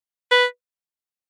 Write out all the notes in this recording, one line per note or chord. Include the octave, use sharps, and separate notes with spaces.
B4